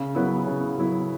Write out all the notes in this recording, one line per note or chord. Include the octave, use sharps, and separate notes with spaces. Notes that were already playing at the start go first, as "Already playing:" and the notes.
Already playing: C#3
F#3 B3 E4
C#3
F#3 B3 E4